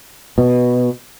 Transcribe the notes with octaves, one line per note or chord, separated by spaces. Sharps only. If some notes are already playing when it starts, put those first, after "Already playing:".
B2